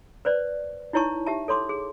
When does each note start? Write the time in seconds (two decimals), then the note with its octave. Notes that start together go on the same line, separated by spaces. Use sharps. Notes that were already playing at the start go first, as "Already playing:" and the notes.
0.25 B4 C5 D5
0.93 D#4 E4 C#5 A5 C#6
1.26 G4 E5 A5
1.48 A4 C#5 C6 D6
1.69 G#4